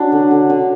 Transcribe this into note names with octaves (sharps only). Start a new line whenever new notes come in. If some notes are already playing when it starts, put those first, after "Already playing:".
Already playing: F#3 D4
D3
D3
D3